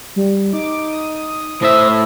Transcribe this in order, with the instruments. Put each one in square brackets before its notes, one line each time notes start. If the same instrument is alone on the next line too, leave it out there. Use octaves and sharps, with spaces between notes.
[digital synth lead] G3
[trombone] D#4 [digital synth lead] D6
[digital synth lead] D#6
[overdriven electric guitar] A2 E5 [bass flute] C5